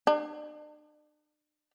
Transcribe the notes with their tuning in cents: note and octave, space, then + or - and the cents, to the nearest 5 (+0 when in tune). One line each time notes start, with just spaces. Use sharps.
D4 +45